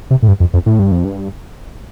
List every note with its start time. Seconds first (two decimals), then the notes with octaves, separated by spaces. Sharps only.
0.11 C3
0.23 A2
0.28 G2
0.40 F2
0.54 F2
0.66 A2
0.79 G2
0.92 F2
1.05 G2